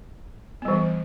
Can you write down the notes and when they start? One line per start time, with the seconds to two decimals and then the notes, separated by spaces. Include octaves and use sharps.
0.62 B3
0.65 G3
0.68 E3